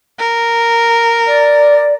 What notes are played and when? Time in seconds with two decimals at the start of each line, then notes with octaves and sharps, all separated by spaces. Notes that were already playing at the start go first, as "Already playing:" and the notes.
0.18 A#4
1.26 D5